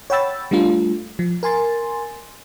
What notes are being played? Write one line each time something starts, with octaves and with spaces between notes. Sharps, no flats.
C#5 F#5 G5 B5 E6 A6
G3 A3 D4 F4
F3
A#4 G#5 C6 A6